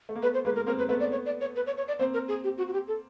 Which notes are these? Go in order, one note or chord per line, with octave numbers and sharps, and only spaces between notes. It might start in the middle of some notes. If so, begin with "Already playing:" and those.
A3
A#3
A3 B3 B4
C5
G#3 A#3 B4
A#4
A#3 C4 A#4
B4
A3 B3 B4
D5
C#5
D5
C#5
B4
C#5
C#5
D5
A#3 C4 C5
A#4
G#4
G4
F#4
F#4
G4
A4